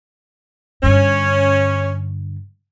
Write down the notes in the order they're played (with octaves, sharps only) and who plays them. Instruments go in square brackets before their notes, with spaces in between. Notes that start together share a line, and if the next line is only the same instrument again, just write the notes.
[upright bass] G2 D3 [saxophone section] C#4